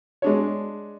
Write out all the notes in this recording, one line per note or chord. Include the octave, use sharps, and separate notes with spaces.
G#3 D4 C#5